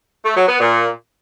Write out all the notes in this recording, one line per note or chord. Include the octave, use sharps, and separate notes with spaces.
A3
F#3
B3
A#2